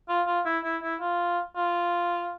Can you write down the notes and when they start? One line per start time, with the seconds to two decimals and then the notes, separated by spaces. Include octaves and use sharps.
0.09 F4
0.28 F4
0.46 E4
0.64 E4
0.83 E4
1.01 F4
1.56 F4